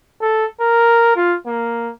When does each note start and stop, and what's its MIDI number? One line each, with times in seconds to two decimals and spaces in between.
0.21 0.46 69
0.60 1.16 70
1.16 1.36 65
1.47 1.92 58